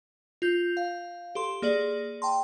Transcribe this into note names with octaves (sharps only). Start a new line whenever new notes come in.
F4 G6
F5
G4 A4 C6
A#3 G#4 D5 F#7
G5 A5 C6